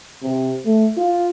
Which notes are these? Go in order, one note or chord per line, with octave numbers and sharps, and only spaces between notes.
C3
A3
F4